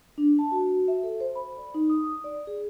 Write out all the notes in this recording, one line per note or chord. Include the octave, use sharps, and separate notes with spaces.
D4
A5
F#4
E5
A4
C5
B5
D5
D#4
D#6
D5
G#4